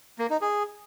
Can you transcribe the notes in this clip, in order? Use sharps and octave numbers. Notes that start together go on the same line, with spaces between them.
A#3
D#4
G#4